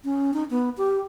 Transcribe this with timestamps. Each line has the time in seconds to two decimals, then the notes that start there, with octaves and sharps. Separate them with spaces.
0.04 C#4
0.34 D#4
0.50 B3
0.77 G4